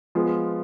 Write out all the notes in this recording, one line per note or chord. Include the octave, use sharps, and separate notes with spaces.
F3 G#3 B3 F4